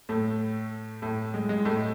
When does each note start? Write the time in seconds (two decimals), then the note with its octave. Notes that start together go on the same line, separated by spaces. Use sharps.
0.09 A2 A3
1.02 A2 A3
1.34 G#3
1.49 G#3
1.65 A2 A3